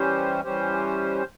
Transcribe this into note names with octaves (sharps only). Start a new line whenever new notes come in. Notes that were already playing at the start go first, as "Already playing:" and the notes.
Already playing: E3 G3 C#4 G4 C5
E3 G3 C#4 G4 C5